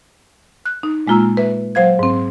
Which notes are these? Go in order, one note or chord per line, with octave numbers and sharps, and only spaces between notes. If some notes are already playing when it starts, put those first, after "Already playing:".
F#6
D#4
A#2 G#3 A#3 F4 A#5 E6
B4 E5
F#3 C5 F5 G#6
G#2 C4